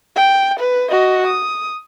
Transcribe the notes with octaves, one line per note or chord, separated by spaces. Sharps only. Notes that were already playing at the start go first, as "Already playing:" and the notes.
G5
B4
F#4 D#5
D#6